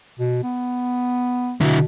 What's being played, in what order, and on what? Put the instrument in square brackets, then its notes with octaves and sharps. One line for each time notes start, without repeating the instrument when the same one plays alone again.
[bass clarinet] B2
B3
[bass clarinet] B2 [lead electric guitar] D3 E4